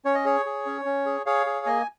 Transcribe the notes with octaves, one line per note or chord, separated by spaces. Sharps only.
C#4 C#5
D#5
G#4 C#5
G#4
C#4
C#4
G#4
G#4 C#5 F5
G#4
A#3 D#5 G#5